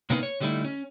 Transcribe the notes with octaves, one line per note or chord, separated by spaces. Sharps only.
C3 A#3 B3 C#4 D#4 B4
C#5
D3 G3 A3 D#4 E4
C#4